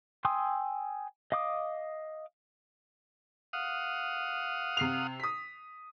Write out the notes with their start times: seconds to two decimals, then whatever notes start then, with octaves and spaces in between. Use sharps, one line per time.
0.25 G5 G#5 C6 D#6 E6
1.32 D#5 F5 D6 D#6
3.53 F5 F#5 D#6
4.77 C3 C7 F7
5.20 D#6 B6